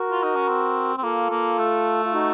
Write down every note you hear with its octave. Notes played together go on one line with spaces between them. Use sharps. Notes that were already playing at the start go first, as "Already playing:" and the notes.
Already playing: F#4 A#4
F4
D#4
C#4
C4
C4
A#3 F4 A4
A#3
A3
F4
D#4 F#4